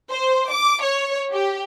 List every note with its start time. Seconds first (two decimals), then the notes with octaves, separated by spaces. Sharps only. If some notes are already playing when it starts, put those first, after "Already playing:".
0.11 C5
0.50 D6
0.83 C#5
1.33 G4